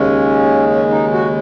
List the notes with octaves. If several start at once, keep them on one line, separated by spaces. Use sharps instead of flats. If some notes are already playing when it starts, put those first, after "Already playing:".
Already playing: D#2 C#3 G#3 C#4
C#4
D#4
F#4